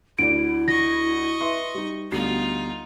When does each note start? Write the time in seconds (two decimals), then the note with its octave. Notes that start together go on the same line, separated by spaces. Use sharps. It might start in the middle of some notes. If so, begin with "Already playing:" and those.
0.19 D2 D3 E4 D5 D7
0.68 D#5 C#6 A#6
1.41 B4 E5 C6
1.74 G3 D#4
2.12 D2 G3 B3 D#4 F4 C7